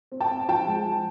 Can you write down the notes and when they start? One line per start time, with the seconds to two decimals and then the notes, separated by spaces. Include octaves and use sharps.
0.12 C4
0.20 G5 A5
0.30 C4
0.49 F3 G5 A5
0.67 G#3
0.85 F3